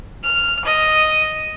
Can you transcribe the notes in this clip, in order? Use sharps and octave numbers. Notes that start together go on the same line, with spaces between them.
F6
D#5